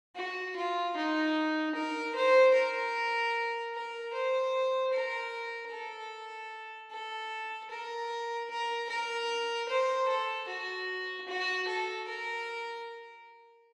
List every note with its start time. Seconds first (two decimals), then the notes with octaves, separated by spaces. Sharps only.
0.16 F#4
0.56 F4
0.96 D#4
1.75 A#4
2.14 C5
2.54 A#4
3.74 A#4
4.13 C5
4.93 A#4
5.72 A4
6.91 A4
7.71 A#4
8.50 A#4
8.89 A#4
9.69 C5
10.08 A4
10.48 F#4
11.28 F#4
11.68 A4
12.07 A#4